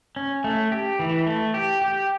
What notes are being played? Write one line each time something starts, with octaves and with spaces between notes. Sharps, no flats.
C#4
A3
G4
E3
A3
G4
G4